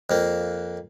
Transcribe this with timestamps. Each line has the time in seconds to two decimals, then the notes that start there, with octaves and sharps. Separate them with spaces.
0.10 F2 A#3